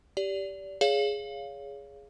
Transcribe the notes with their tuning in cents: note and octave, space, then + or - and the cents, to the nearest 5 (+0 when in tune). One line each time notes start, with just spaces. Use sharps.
G4 +0 D5 -25
G#4 +0 C#5 +25 F5 -5